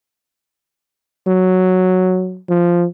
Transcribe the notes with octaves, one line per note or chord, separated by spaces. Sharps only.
F#3
F3